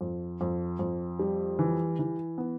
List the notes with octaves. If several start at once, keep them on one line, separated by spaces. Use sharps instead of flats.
F2
F2
F2
G3
E3
E3
B3